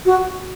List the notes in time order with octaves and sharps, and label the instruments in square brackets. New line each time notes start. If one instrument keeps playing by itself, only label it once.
[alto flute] F#4